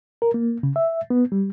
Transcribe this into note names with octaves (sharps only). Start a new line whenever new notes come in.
A#4
A#3
C#3
E5
B3
G3